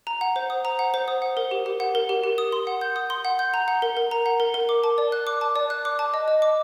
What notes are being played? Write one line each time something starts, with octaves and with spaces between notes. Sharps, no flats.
A#5
F#5
C5
D#6
A#5
F#5
C5
D#6
F#5
A#4
G4
G4
F#5
A#4
G4
G4
D#6
C6
F#5
G6
D#6
C6
F#5
G6
A#5
F#5
A#4
A#4
A#5
F#5
A#4
A#4
D6
A5
D5
F#6
D6
A5
D5
F#6
D6
A5
D#5
D#5
D6